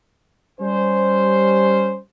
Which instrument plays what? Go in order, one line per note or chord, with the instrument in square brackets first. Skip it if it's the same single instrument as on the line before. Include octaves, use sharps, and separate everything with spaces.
[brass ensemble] G3 C#4 C5